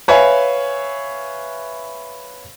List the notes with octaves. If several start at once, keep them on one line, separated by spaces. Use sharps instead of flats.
B4 C#5 E5 F5 G#5